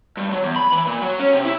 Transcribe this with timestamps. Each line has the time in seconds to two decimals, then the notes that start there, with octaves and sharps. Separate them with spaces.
0.17 G2
0.31 F#3
0.43 E2
0.56 B5
0.72 E3
0.87 A#2
1.01 F#3
1.20 C#4
1.33 C3
1.45 E4